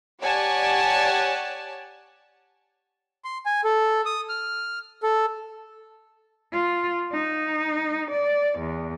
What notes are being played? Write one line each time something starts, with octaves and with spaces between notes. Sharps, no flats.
G4 C#5 D5 F#5 G#5 A5
C6
G#5
A4
D#6
F6
A4
F4
D#4
D5
E2